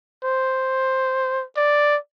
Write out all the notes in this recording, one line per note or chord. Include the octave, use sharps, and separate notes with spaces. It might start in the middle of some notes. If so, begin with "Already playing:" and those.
C5
D5